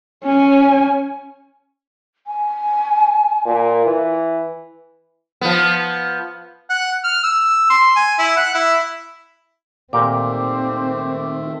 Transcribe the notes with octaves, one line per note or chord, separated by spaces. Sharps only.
C#4 G#5
G#5
A#2
E3
F3 B3
F#5
F6
E6
C6
G#5
E4
F#5
E4
A#2 D#3 A3 C4 G4 A#4 D6